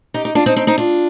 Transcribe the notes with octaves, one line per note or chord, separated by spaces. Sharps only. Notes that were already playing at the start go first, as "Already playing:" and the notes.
D#4 G4
D#4
D4 F4
C4 D#4
C4 D#4
C4 D#4
D4 F4